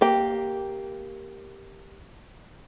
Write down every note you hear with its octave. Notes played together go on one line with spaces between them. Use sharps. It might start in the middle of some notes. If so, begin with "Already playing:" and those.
A#3 G4 G5